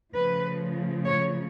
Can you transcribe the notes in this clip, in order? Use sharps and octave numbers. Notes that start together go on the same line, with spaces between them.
C#3 F3 A3 B4
C#5